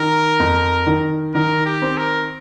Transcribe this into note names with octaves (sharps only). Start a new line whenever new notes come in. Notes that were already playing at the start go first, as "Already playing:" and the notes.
Already playing: D#3 A#4
F2
D#3
D#3 A#4
G4
C4
A#4